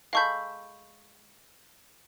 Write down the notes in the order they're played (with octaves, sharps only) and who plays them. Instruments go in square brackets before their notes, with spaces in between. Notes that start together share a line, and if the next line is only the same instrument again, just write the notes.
[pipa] G#3 A4 B5 [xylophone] F5 C#6 G6